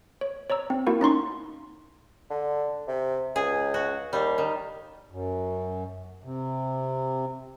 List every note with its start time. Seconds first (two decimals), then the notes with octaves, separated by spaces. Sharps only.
0.21 C#5
0.50 C#5 D5 A#5 E6
0.70 C4
0.87 A#3 E4 F#4 A#4 F#5
1.01 C#4 D#4 C6 C#6
2.30 D3
2.88 C3
3.36 C#2 G#4
3.74 F#4
4.13 D#2 G3 F5
4.38 D#3
5.11 F#2
6.24 C3